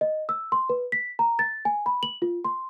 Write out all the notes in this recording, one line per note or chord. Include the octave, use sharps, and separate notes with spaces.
D#5
E6
C6
B4
B6
A#5
A6
G#5
B5
F#7
F4
C6